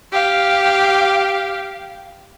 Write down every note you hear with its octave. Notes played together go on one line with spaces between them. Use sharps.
G4 F5